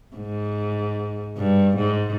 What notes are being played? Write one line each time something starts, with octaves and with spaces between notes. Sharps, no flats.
G#2
G2
G#2